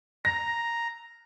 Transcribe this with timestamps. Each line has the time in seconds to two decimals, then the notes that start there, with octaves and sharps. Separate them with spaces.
0.25 A#5 A#6